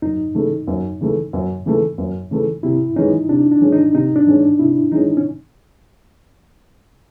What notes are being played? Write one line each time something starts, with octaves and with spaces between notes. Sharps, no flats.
F#2 D#4
C#3 E3 A3
F#2
C#3 E3 A3
F#2
C#3 E3 A3
F#2
C#3 E3 A3
C3 E4
E3 G#3 C#4 D#4
C3 D4
D4
E3 G#3 C#4
D#4
C3 D#4
D4
E3 G#3 C#4
C3 E4
E3 G#3 C#4 D#4
C#4